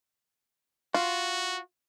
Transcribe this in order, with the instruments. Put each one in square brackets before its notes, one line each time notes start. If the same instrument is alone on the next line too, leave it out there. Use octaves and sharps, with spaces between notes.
[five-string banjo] F4 [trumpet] F#4